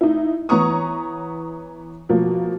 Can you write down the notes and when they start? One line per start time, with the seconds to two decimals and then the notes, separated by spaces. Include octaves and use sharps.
0.01 D#4 E4
0.49 E3 B3 C#5 A#5 C#6 D#6
2.09 B2 F3 A#3